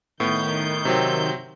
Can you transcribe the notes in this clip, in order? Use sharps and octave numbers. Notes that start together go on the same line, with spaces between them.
A2 D#3 B3 G6
C3 F#3 C4